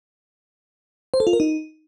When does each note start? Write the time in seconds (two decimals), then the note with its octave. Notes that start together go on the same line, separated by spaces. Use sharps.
1.14 C5
1.20 A4
1.27 F4
1.33 A#4
1.40 D#4